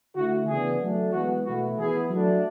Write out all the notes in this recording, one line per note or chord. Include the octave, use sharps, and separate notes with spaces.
D3 A3 E4 F#4
C#3 E3 B3 D4 G#4
F#3 A3 D4
E3 G#3 B3 F#4
B2 A3 E4 F#4
E3 B3 E4 G#4
F#3 A3 D4